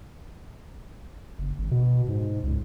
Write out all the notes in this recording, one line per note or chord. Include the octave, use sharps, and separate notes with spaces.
F#1
G#1
B2
G#2
C#2